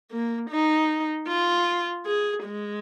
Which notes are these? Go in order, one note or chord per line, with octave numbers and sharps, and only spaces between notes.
A#3
D#4
F4
G#4
G#3